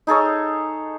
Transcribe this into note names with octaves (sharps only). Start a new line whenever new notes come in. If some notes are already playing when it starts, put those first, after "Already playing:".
D#4 G#4 A4 C#5